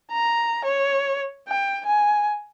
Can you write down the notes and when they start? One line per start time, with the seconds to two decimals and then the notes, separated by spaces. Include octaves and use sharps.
0.12 A#5
0.65 C#5
1.48 G5
1.86 G#5